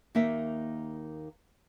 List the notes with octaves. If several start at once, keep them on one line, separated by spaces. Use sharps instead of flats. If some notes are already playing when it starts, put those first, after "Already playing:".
D#2 A#3 D#4 A#4 E5